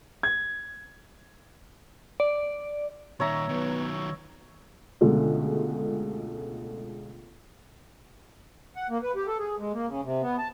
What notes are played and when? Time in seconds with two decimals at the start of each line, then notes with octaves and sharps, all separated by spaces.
0.23 G#6
2.20 D5
3.20 A#2 D#3 C#5 E5 A#5
3.49 D#3 F#3 B3
5.01 C#2 B2 D3 G#3 A3
8.76 F#5
8.90 A#3
9.03 B4
9.15 G4
9.27 A4
9.39 G#4
9.58 G#3
9.73 A#3
9.87 C#3
10.04 C3
10.22 B3
10.39 A5